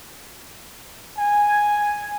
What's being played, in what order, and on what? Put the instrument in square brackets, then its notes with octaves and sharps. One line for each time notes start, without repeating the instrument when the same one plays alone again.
[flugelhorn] G#5